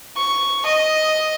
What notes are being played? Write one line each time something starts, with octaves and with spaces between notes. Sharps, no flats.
C#6
D#5